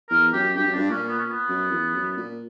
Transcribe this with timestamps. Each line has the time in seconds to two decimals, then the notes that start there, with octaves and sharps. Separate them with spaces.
0.10 E2 A#4
0.33 F#2 G4
0.56 G2 G4
0.66 F#2
0.73 G2 D4
0.90 A#2 C#4
1.08 B3
1.19 C#4
1.30 B3
1.49 F#2
1.71 E2
1.94 F#2
2.17 A#2